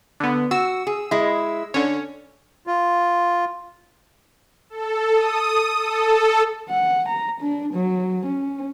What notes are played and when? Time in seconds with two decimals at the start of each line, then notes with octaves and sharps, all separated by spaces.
0.20 D3 B3
0.51 F#4 E6
0.87 G#4
1.11 G#3 E4
1.74 D3 C#4 C#5
2.67 F4
4.70 A4
5.14 D#6
5.80 A4
6.69 F#5
7.08 A#5
7.40 D4
7.73 F#3
8.25 C#4